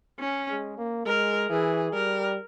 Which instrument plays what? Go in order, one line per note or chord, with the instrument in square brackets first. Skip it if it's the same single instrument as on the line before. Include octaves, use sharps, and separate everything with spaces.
[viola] C#4
[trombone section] G#3
A#3
[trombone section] G#3 [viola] A#4
[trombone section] E3 [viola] G#4
[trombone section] G3 [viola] A#4